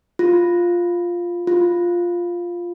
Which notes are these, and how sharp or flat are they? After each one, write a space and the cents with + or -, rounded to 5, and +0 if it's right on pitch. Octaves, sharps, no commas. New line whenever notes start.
F4 +0
F4 +0